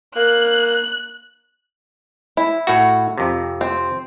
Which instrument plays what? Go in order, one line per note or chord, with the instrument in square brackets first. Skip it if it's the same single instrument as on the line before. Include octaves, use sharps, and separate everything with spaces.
[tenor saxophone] A#3 [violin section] F#6
[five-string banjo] E4
[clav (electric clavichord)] A2 F#4
F2 C3
[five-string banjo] C4